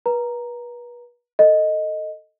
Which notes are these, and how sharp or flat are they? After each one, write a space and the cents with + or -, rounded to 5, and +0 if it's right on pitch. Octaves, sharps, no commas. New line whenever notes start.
B4 -35 A#5 +0
A4 +15 D#5 +0